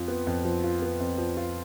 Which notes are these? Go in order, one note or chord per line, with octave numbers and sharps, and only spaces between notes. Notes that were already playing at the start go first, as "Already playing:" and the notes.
Already playing: F2 F3 F4
B3
F2
F3
F4
B3
F2
F3
F4